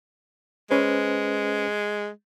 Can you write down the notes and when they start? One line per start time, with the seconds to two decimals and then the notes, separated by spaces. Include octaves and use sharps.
0.71 G#3 C#4 B4 C5